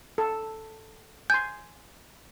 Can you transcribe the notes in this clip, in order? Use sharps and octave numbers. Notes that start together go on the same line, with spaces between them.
A4
G#5 C6 G6